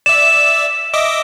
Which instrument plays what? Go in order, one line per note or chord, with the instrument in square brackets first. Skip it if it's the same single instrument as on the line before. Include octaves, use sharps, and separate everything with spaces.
[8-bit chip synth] D5 E5 [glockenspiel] E7
[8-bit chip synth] D#5 E5 D6